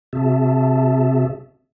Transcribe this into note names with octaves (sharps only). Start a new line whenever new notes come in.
C3 C4 F#4 G#4 E5 A5